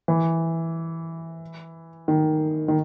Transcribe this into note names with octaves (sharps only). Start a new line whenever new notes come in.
E3
D#3
D#3